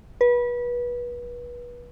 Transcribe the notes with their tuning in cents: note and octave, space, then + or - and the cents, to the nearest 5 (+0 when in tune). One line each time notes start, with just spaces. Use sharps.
B4 -30